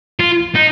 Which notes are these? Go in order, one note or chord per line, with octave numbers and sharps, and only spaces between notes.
F4
D#4